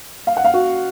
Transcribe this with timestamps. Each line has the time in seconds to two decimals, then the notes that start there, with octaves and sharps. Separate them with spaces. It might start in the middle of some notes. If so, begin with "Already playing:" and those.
0.27 F5
0.37 F#5
0.45 F5
0.54 F#4